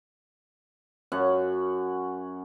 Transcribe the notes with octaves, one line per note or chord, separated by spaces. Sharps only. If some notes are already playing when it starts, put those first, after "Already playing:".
F#2 C#4 F#5